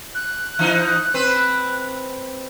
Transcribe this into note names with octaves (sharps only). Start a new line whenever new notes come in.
F#6
E3 D#4
C4 B4